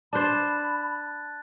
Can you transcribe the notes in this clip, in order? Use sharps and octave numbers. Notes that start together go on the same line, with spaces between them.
D4 C5 A5 B5 F#6 A6